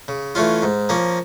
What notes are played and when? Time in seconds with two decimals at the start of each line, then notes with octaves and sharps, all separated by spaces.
0.08 C#3
0.35 E3 A3 C#4 F4
0.62 G#2
0.89 F3 A#3 C#4